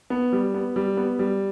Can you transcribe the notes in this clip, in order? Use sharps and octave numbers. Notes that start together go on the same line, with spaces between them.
B3
G3
B3
G3
B3
G3